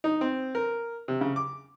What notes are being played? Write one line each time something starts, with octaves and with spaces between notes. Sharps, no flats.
D#4
C4
A#4
C3
C#3
D6